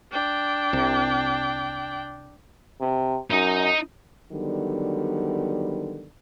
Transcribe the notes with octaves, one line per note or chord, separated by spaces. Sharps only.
D4 G5
C2 C3
C3
F#2 D#4 D#5
D3 D#3 F#3 G3 B3